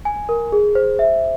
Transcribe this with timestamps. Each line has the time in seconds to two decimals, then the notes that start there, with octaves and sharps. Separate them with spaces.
0.05 G#5
0.29 A#4
0.52 G#4
0.75 C5
0.99 E5